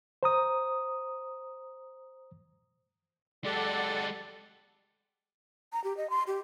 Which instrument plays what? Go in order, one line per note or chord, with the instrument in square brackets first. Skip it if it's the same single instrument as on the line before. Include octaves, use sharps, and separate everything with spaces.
[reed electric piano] C5 A#5 D#6
[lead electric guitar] G#3 G4 [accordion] A4 D5 F#5
[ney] A#5
G4
D#5
C6
G4